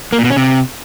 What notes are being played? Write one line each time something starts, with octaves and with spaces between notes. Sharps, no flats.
A#3
A#2
B2
C#4
C3